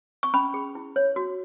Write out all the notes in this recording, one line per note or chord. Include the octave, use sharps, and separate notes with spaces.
C#6
C#4 B5
G#4
E4
C#5
F#4